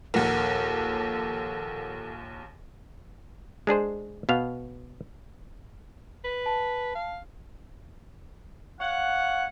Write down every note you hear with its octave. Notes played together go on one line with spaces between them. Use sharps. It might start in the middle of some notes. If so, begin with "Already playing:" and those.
A#1 D#2 A4 A#4 F#5
G#3 D4 G#4 C5
B2 B3 F5
B4
A5
F5
C#5 F5 F#5